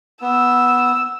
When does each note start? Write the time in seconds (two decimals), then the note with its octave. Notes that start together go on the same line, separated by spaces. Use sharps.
0.22 B3 E6